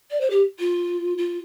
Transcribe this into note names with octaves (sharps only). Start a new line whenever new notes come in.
D5
C5
G4
F4
F4